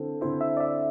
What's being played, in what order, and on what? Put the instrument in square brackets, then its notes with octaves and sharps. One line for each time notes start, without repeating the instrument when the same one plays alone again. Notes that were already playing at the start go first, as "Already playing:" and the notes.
Already playing: [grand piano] D3 C4 E4 [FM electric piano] A4
[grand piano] D3 C4 E4 [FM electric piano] C5
[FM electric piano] E5
D5
E5